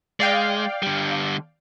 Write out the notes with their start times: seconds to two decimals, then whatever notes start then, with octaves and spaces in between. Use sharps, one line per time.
0.20 G#3 D5 F5 G5
0.83 D3 G3